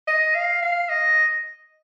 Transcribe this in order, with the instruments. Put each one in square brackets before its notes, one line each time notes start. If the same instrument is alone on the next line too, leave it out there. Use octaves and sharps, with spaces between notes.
[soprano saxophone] D#5
F5
F5
D#5